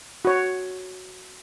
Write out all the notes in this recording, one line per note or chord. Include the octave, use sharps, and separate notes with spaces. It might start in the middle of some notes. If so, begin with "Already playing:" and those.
F#4 C#5